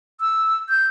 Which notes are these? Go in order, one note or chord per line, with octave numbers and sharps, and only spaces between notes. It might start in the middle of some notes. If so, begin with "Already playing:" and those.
E6
G6